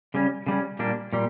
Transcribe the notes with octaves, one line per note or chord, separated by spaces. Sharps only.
C#3 G3 C#4
C#3 G3 C#4
A#2 G3 A#3 D4
A#2 G3